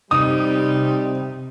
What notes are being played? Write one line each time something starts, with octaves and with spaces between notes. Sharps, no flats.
C3 G3 C4 D#4 D#6